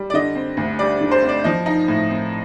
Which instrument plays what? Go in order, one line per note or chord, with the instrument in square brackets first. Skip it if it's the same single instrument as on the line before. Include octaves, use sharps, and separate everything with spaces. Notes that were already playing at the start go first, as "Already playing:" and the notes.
Already playing: [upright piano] G3
D5
D3 D#5
C4
D2
G3 D5
D3
C5
C4
D5
F3 D#5
D#4
A2
C4